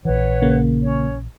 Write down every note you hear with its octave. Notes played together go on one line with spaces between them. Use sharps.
A#1 E3 B4 C#5 F#5
C#3 A#3
C#4 C#5